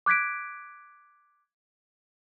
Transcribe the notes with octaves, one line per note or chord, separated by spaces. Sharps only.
D6 F#6 G#6 B6 D7